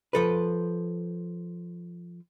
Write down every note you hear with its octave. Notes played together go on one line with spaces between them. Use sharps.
F3 A4 B4